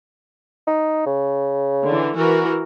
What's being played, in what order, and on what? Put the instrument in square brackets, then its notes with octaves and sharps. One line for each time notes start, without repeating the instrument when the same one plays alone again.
[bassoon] D#4
C#3
[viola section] D3 E3
E3 F#4 A#4